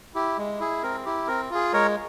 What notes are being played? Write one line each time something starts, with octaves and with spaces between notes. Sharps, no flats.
E4 G4
G#3
E4 G#4
C4 A#4
E4 G4
C4 A#4
F4 G#4
G#3 A#4 C#5